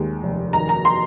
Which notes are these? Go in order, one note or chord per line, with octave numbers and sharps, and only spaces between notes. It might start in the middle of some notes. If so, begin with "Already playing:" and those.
Already playing: D#2 G#3
F1
D#3 A#5
A#5
C6